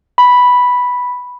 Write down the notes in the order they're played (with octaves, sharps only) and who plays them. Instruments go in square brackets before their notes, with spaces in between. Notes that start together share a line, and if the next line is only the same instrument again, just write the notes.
[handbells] B5